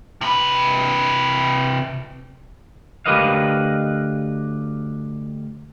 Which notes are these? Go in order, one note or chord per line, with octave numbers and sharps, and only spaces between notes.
C3 B4
D2 G4 A#4 B4 D#5 F5